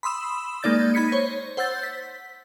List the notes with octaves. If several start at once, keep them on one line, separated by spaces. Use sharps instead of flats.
B5 C6 D#6 E6 E7
G#3 A#3 D#4 D5 G6 A6
D#4 B5 G#6 B6 C#7
C5 C#5
C5 F#5 E6 G6 A6
B6